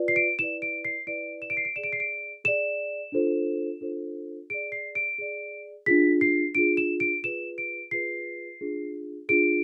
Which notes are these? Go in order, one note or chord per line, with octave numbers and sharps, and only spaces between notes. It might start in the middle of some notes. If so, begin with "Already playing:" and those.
Already playing: F4 B4 D5
C7
D7
E4 B4 D5 E7
D7
C7
E4 B4 D5 D7
E7
D7
C7
D7
G#4 D5 E7
D7
C7
D7
G#4 D5 E7
D4 F4 A4 C5
D4 F4 A4 C5
G#4 D5 D7
C7
D7
G#4 D5
D4 F4 G#4 B6
C7
D4 F4 G#4 D7
E7
D7
F4 G#4 B4 E7
D7
F4 G#4 B4 C7
D4 F4 G#4
D4 F4 G#4 D7